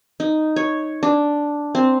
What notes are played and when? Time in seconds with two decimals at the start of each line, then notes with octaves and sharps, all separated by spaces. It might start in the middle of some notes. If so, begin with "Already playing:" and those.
0.20 D#4
0.56 C#5
1.03 D4
1.75 C4